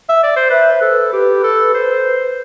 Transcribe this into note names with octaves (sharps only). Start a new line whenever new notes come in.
E5
D5
C5
B4 E5
C5
A4
B4
G4
A4
C5